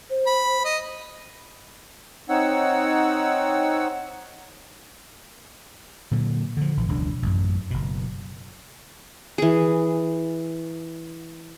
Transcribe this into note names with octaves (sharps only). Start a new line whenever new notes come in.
C5
B5
D#5
C4 D#4 C#5 F#5 E6
A#2 D3 F#3
D3 F3
A#1 E3
E1 C#2 F#3 D4
A1 F#2
F#1 B2
E3 G#4